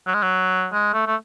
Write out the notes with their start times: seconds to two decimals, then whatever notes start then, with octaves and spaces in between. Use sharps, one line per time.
0.07 F#3
0.14 G#3
0.22 F#3
0.72 G#3
0.94 A3
1.07 A3